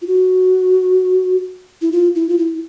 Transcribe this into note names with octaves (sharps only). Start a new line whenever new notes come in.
F4
F#4
E4
F4
E4
F4
E4